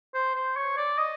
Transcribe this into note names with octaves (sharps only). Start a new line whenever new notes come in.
C5
C5
C#5
D5
D#5